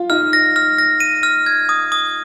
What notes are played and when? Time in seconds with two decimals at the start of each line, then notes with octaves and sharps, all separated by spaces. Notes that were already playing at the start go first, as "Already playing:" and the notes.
Already playing: F4 F5
0.10 D#4 D#5 F6
0.33 A#6
0.56 F6
0.78 A#6
1.00 D#7
1.23 F6
1.46 G#6
1.69 D#6
1.92 D#6